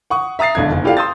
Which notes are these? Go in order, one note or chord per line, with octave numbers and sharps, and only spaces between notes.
F#5 C#6 D#6
E5 A#5 D#6 A6 C7
E1 B1 D3 G#6
F#1
E4 F4 G4 A4 D5 F5
C6 D#6 E6 G6 A6